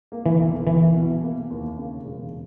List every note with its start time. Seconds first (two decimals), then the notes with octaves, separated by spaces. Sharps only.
0.12 A#3
0.26 E3
0.40 B1
0.67 E3 E4
0.95 B2
1.23 A#3
1.50 D#2
1.78 C#3
2.06 E1